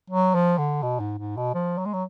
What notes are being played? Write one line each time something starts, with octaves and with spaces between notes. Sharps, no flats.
F#3
F3
D3
B2
G#2
G#2
B2
F3
F#3
G#3
F#3